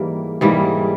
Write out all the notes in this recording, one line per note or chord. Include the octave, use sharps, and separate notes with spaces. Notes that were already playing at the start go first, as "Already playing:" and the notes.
Already playing: G#2 E3 G3 A#3
G#2 E3 G3 A#3